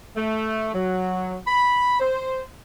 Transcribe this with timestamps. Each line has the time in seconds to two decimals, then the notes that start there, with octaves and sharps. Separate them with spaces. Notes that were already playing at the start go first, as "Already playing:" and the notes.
0.16 A3
0.74 F#3
1.47 B5
2.00 C5